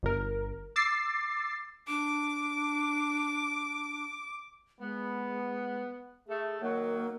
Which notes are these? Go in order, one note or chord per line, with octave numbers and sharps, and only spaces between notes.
G1 A#4
D6 E6 A6 C7
D4 D6
G#3 B3
A3 G#4
D#3 F#3 A#3